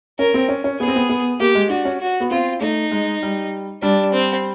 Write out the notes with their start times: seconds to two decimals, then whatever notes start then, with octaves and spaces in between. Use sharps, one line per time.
0.19 C#4 A#4
0.34 C4
0.49 C#4
0.64 C#4
0.80 B3 G#4
0.88 C4
0.96 B3
1.09 B3
1.40 A#3 G4
1.55 G#3
1.70 D4 F#4
1.85 C#4
2.01 F#4
2.20 B3
2.31 C4 F4
2.61 A3 D#4
2.91 G#3
3.23 G3
3.82 G3 D4
4.13 C4